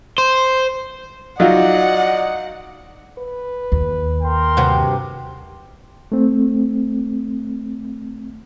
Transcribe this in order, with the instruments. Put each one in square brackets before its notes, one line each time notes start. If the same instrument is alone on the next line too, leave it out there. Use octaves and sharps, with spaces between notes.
[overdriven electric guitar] C5
[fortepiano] F#3 D#4 F4 [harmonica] D5 D#5 [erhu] F#5
[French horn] B4
[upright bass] D#2
[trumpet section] A#4 G5 C6
[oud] G2 C3 F#4
[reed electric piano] A3 C4